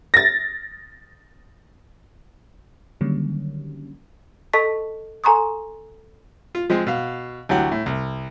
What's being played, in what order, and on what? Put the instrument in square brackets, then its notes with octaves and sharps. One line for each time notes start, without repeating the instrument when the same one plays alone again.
[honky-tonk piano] A6 A#6
[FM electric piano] D3 D#3 F#3 G3 A#3 C#4
[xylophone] A4 D#5 A5 C#6 B6
A4 G#5 A#5 C6 C#6 D#6
[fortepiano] F4
F3 G#3 C4
B2 F5
D2 E3 F#3 G4 F#5
A2
C2